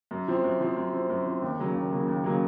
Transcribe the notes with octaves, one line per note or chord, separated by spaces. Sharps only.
F#2
F3 C4
F#2
F3 C4
F#2
F3 C4
F#2
F3 C4
D#2
C#3 F#3 A#3
D#2
C#3 F#3 A#3
D#2
C#3 F#3 A#3